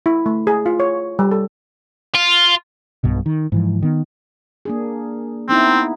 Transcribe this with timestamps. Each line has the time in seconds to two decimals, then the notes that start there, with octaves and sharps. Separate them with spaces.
0.06 E4
0.26 A3
0.47 G#4
0.66 F4
0.80 C#5
1.19 G3
1.31 A4
2.15 F4
3.04 B1 G2 B2
3.26 D#3
3.52 G#2 E3 F3
3.82 D#3 B3
4.65 A#3 D4 G#4
5.49 B3 C4 D#4 E4